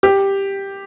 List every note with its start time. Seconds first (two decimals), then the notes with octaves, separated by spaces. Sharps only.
0.03 G4